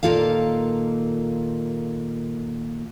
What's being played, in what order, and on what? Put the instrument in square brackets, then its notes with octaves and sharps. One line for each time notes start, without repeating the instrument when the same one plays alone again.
[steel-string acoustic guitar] A#2 D#3 A#3 F4 A4 F5